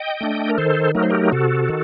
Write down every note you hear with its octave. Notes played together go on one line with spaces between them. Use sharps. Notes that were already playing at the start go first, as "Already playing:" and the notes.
Already playing: D#5 G5
A3 D4
A#4
D#3 A4 C5
F#3 A3 D#4 A#4
C5
G4 A#4
C3 F#4 A4
D#3